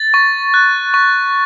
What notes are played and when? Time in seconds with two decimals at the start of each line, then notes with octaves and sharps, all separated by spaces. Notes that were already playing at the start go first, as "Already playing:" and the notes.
Already playing: A6
0.14 C#6
0.54 F#6
0.94 C#6